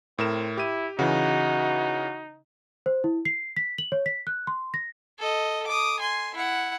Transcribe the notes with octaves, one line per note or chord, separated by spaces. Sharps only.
A2 C4 A#4 E7
E4 G4 D#7
C#3 E3 D#4 F#4
C5
E4
C7
B6
F#7
C#5
B6
F#6
C6
A#6
A4 D#5
D6 D#6
G#5 C6
E4 F#5